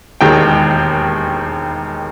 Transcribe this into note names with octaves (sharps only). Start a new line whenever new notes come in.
E1 D#2 D#3 G#3 G5